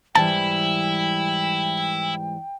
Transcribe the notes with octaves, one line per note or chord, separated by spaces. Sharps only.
G#2 E3 G3 E4 G5 A5